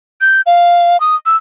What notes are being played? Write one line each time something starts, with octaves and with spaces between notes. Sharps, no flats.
G6
F5
D#6
E6